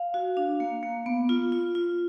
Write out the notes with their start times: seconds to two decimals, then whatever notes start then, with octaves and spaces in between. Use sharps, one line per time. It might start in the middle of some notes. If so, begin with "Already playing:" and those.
Already playing: F5
0.14 F#4
0.37 D4
0.60 A#3
0.83 A#3
1.06 B3
1.29 F4
1.52 F4
1.75 F4